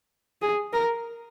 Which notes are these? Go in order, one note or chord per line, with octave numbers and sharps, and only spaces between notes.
G#4
A#4